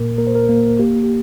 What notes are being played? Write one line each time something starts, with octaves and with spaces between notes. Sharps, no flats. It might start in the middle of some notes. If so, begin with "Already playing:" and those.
Already playing: A#2 A#3 A#4
A#3 A#4
C5
A#4
A#3
A#3 G4
G4